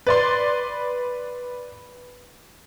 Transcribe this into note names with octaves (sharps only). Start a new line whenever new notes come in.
B4 D5 C6